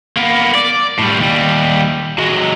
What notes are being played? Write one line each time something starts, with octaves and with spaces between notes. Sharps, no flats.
A#3 B3
D5
A2 G3
D#2 G3
F#3 G#3